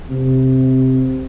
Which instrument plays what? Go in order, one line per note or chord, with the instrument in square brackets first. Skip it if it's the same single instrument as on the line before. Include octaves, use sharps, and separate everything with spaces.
[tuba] C3